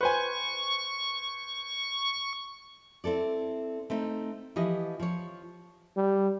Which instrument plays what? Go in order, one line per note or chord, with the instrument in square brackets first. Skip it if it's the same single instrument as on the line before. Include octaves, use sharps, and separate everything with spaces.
[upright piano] B4 C5 G#5 [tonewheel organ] C#6
[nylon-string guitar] C4 E4 A4 D5
A3 C4 D#4
E3 F3 G4 D#5
F3 C#5
[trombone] G3